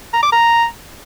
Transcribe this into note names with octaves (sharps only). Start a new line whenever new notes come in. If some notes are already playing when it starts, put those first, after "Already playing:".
A#5
D6
A#5